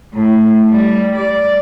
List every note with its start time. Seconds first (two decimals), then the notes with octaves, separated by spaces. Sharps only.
0.13 A2
0.70 G3
1.15 D5